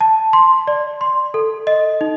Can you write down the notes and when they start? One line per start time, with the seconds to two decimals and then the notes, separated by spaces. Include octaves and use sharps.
0.01 A5
0.33 C6
0.67 D5
1.01 C6
1.34 A4
1.67 D#5
2.01 D#4